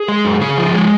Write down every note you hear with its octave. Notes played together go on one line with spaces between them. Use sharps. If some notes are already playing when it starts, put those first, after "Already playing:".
Already playing: G#4
G#3
F#2
C#3 G#4
F3
G#3